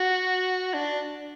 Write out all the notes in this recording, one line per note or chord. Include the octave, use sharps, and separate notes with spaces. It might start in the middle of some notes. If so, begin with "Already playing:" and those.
Already playing: F#4
D4